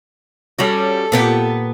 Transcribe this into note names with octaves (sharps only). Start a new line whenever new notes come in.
G3 C#4 F#4 A4
A#2 B3 G4